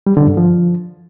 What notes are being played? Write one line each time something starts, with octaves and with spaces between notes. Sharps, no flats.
G3
D3
G2
F3